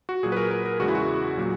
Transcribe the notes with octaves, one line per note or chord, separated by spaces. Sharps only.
F#4
A#2 F#3 G#4
B4
A#4
A#4
A#4
E2 C#3 G#3 F#4
E4
F#4
A#2 F#3